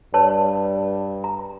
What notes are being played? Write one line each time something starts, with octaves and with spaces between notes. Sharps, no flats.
G2 B4 C#5 A5
A#5